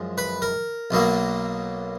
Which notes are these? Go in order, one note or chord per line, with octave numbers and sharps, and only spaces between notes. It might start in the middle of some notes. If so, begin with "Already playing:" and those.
Already playing: F#2 F3 G#3
B4
A#4
B1 B2 F#3 A#3